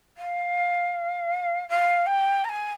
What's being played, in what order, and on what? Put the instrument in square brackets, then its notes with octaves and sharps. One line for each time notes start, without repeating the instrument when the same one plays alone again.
[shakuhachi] F5
F5
G5
A#5
G#5